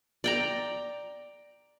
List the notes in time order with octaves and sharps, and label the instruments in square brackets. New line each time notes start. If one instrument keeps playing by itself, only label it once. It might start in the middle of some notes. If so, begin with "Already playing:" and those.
[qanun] D5 G5 A#5